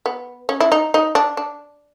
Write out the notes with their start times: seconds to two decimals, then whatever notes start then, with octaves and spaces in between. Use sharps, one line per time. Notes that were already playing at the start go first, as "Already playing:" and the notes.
0.06 B3
0.49 C#4
0.60 E4
0.72 D#4
0.94 D#4
1.15 D4
1.37 D4